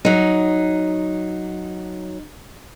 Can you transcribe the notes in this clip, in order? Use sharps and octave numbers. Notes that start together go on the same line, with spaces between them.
F#3 D#4